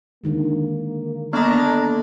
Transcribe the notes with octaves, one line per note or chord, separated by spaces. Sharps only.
D3 D#3 G#3 A#3
A#3 B3 D4 A4 A#5